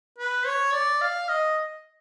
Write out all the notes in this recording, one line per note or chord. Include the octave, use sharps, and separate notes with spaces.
B4
C#5
D5
F5
D#5